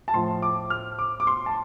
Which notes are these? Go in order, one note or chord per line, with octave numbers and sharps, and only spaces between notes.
A5
A2 F3 C6
D6
F6
D6
D6
C6
A5